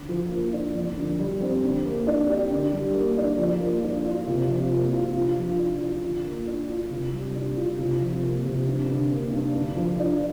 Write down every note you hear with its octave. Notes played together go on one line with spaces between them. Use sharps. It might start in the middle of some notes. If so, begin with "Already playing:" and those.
Already playing: D3
F3
A#3
D4
F2
D3
G3
C4
D3
A#3
D4
G4
D3
G3
A#3
D4
F3
A#3
D4
F4
C3
F3
A#3
F4
G2
F3
D4
F4
D3
A#3
D4
F4
C3
G3
D4
F4
C3
F3
A#3
C3
G2
D3
A#3
G2
D3
F3
D4